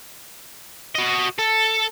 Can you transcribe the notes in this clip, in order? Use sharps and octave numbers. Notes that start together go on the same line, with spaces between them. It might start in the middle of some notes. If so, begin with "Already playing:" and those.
F#4 D#5
A4